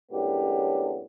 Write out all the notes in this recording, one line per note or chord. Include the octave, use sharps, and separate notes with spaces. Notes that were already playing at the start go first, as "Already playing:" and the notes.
F#2 A2 G#3 B3 D4 G4